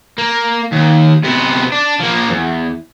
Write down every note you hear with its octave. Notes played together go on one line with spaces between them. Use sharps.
A#3
D#2
C3 B3
D4
F3 A#3
E2